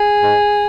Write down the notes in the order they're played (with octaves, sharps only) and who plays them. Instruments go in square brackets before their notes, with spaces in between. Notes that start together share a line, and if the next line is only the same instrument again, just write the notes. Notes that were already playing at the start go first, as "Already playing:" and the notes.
Already playing: [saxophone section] G#4
G#2